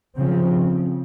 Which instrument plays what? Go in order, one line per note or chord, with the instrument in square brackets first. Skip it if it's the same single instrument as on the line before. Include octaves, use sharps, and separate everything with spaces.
[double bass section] C#3 F3 C4